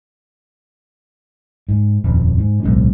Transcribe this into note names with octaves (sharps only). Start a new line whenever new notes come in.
G#2
D#1 F2
G#2
D1 B1 G#3 D4